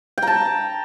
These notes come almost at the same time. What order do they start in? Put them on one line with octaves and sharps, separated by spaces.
G5 A#5 A5